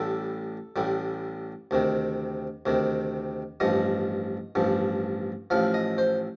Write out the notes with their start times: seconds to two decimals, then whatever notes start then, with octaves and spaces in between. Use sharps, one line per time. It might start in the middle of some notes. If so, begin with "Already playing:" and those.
Already playing: A1 A2 G3 A4
0.76 A1 A2 G3
1.71 D2 C3 D#3
2.66 D2 C3 D#3
3.60 A1 G2 F3 D#5
4.55 A1 G2 F3
5.50 A1 A2 F3 F5
5.74 D#5
5.98 C5